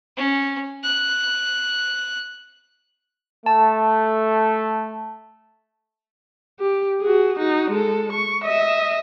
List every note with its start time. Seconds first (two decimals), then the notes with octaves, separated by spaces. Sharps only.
0.17 C#4
0.84 F#6
3.46 A3 A5
6.60 G4
7.01 F#4 G#4
7.39 D#4 F#4
7.71 G#3 A4
8.12 C#6
8.44 D#5 E5